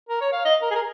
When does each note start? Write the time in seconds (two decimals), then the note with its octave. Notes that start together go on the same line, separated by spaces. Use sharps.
0.09 A#4
0.21 C#5
0.32 F5
0.45 D#5
0.62 A#4
0.71 G#4
0.75 A#4